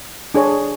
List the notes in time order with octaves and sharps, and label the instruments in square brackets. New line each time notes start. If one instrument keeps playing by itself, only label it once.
[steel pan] D4 G#4 C#5